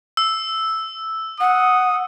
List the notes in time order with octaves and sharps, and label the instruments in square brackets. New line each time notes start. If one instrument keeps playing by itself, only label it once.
[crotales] E6
[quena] F#5 [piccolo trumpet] D#6